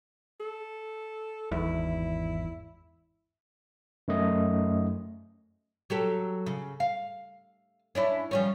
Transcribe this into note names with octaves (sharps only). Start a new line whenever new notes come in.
A4
G#1 E2 G#2 E4
F#2 A3 D#5
F#3 G4 A4
C#3
F5
C#4 D4 E4
F3 G3 C#4